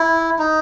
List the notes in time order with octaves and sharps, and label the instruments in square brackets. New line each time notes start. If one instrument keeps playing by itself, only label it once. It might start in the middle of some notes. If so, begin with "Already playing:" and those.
Already playing: [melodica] E4
D#4